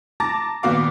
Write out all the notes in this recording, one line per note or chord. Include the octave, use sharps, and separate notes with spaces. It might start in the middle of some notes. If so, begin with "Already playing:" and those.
A5 A#5 D6 A6 A#6
G#1 A#2 B3 F#4 F5 D6